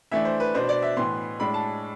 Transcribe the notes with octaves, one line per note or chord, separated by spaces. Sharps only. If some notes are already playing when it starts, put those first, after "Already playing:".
E3 A3 D4 E5
C5
B4
B2 B3 D4 C5
D5
E5
A2 E3 B3 C6
A2 G#3 D4 B5
A5